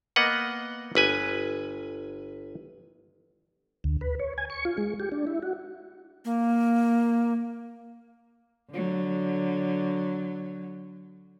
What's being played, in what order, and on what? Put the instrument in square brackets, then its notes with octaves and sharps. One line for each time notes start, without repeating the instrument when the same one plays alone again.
[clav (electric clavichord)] A#3 B3 D#5 F#5
G1 B4 G#5
[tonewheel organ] D2
B4
C#5
G#5
C#6
F4
G#3
G4
D4
E4
F#4
[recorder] A#3
[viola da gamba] D3 F#3